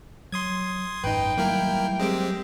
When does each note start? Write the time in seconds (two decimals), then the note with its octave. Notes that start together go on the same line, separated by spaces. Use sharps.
0.32 F#3 C6 D#6 G#6
1.04 G#1 F#2 D#4 B4 G5
1.38 F#3 G3 A3 A#3 E4 A#4
1.99 G#3 C4 G4